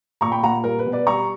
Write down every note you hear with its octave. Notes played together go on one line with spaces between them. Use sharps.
A#2 A#5 C#6
G5 B5
A#2 F#5 A#5
G3 A#4
B4
B2
B4 D5
G3 A#5 C#6